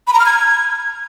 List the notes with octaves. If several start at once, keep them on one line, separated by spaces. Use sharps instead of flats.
B5
A#5
F6
G#6